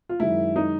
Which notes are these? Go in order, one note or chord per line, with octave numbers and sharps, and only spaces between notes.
F4
F#2 D#3 G#3 E4
D#4